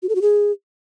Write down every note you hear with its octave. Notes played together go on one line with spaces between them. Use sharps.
F#4
A4
F#4
G#4